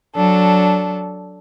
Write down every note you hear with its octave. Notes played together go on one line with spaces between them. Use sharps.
F#3 D4 A4